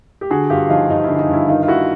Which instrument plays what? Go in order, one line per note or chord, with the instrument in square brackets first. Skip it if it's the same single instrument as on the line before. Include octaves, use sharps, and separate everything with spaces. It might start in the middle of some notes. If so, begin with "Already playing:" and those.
[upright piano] G4
D3 F#4 G#4
G2 F4 G4
F3 D#4 F4
G2 D#4
D3 E4
D#4
G2 E4
D#3 D#4 F4
F4
D#3 E4 F#4